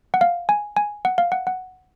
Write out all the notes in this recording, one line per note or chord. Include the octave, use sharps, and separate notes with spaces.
F#5
F5
G#5
G#5
F#5
F5
F#5
F#5